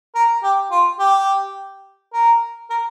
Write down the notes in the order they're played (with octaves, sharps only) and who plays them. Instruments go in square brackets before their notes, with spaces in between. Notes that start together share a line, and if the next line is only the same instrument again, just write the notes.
[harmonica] A#4
G4
F4
G4
A#4
A#4